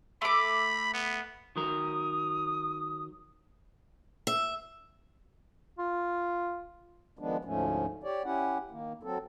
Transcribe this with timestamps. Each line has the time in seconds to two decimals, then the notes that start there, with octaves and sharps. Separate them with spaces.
0.22 A3 B5 D6
0.94 B3
1.56 D#3 F#3 A#4 D#6
4.27 E5
5.78 F4
7.19 D#3 F3 G#3 B3 D4
7.45 D2 G#2 F3 A3 C#4
8.04 G4 C#5 D5
8.24 C#4 E4 G4 F#5
8.71 D#3 A#3
9.03 F#3 C4 A4